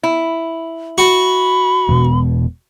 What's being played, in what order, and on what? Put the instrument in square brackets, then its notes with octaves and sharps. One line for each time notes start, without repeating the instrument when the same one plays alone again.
[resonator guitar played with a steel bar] E4
[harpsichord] F#4 [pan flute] B5
[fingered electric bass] E1 B2